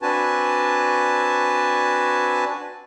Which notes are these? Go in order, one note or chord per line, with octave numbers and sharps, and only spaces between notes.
C4 D4 F#4 B4 G#5 A5